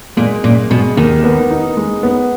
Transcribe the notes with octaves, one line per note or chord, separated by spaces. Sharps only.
A#2 G#3
F#2 A#2
B2 G#3
D#2 D#3
B3
D#4
G#3
B3